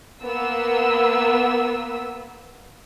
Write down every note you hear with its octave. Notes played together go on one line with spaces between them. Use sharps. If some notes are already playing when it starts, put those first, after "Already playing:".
A#3 B3 E6